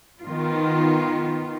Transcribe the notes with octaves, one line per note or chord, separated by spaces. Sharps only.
D#3 B3 F4